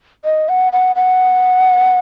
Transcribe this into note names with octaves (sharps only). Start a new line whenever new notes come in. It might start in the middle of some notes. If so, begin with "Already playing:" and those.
D#5
F#5
F#5
F#5